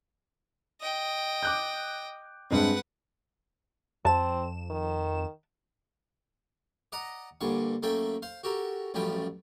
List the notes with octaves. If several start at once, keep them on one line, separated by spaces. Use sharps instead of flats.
D#5 G5
D6 F#6 G6
G2 G#3 C4 B4 F#5
F2 C4 A5 E7
D#3
D5 D#5 F#5 A#5 D#6
G2 A#2 D3 C#6
F#2 A3 A#3 A4 E5 G5
C5 F5
F#4 G4 A4 A#4
A1 F#2 F3 G3 A3 G5